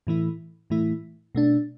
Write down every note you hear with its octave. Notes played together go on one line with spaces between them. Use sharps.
A2 E3 A3 E4
A2 E3 A3 E4
B2 A3 D4